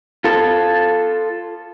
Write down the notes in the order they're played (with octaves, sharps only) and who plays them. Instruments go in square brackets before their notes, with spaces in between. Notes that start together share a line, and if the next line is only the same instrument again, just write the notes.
[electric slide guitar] F4 A4